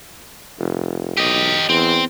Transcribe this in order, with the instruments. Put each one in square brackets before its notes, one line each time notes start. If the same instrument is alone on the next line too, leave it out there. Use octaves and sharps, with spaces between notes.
[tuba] F1
[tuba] B1 [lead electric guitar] G4 D#5
[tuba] E2 [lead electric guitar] C4